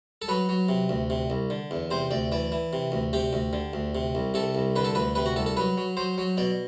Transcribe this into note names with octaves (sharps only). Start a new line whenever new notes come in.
A4
F#3 B4
F#3
C3
D2
C3
C2
D3
E2
C3 C5
D2 D5
E3 D5
E3
C3
D2
C3 G4
D2
D3
D2
C3
C2
C3 A4
C2
D3 B4
A4
D2 B4
C3 B4
F#4
C2 A4
A4
F#3 B4
F#3
F#3 C5
F#3
B2 D5